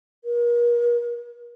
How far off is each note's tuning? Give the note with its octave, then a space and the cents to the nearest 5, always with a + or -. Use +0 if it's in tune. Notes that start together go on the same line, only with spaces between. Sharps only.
A#4 +40